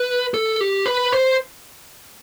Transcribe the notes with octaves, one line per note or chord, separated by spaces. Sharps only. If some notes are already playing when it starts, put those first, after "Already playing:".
Already playing: B4
A4
G4
B4
C5